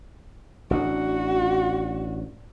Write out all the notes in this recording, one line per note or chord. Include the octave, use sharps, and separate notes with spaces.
A1 D4 F#4